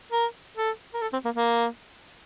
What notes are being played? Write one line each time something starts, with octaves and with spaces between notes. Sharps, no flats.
A#4
A4
A#4
A4
C4
A#3
A#3